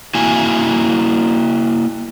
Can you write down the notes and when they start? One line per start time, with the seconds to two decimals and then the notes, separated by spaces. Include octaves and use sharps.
0.15 A#3 E4 F#4 G#5